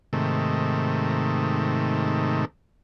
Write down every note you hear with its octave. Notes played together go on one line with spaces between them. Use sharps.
G#2 C3 D#3 A3